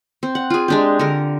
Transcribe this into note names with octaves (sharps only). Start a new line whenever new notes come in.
C4
F#5
F4 G#4
G#3 D4 G4
D3 A#4